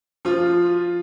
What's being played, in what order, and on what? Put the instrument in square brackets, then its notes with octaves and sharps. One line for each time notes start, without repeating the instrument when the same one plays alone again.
[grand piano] F3 F4